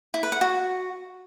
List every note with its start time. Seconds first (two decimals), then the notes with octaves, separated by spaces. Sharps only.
0.14 E4
0.23 B4
0.32 F#5
0.41 F#4